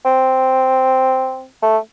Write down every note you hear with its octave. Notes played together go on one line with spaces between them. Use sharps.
C4
A3